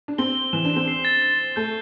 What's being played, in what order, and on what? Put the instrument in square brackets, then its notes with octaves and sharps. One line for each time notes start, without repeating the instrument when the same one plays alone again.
[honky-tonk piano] D4
[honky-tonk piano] C4 [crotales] G7
[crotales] G7
[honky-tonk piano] E3 [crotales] E7
[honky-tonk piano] D4
[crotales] E7
[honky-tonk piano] C4
[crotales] C7
A6
A6
A6
[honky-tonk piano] A3 [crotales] G6